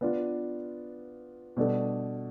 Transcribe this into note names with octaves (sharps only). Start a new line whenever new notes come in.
B3 D4 F4
B2 G3 D4 A4